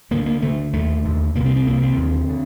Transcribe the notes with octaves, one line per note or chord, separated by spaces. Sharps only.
D2 D3 A#3
A#3
D2 D3 A3
D#2 D3 A3
D#2 D3
C2 C3 A#3
C4
C4
C2 C3 A#3
C4
D#2 D3
D3